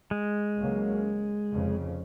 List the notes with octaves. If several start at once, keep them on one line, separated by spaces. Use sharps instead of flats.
G#3
C#2 C#3 F#3 A#3 C#4
F1 F2 C#3